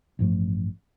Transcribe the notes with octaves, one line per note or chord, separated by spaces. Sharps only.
A1 G2 F3 A3